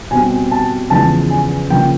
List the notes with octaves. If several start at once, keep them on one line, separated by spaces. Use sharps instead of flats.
B2 G3 C4 G#5
A5
E2 C#3 F3 G#3 A5
G#5
C#3 F3 A#3 G5